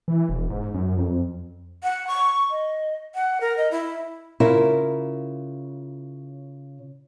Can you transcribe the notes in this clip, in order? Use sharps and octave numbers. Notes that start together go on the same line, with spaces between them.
E3
E1
G#2
F#2
F2
F#5
C#6
D#5
F#5
A#4
D#5
E4
C#3 E4 F4 A#4